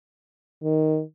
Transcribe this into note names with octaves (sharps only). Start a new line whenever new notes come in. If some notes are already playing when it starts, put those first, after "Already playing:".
D#3